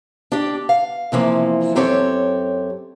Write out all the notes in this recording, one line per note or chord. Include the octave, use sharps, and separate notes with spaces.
D4 G4
F5
C3 E3 F3 A#3
F#2 C4 G4 A4 C#5